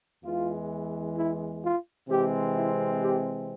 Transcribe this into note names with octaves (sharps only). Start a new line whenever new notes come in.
E2 E3 G#3 F4
E4
F4
C3 E3 G#3 C4 G4
E4
G4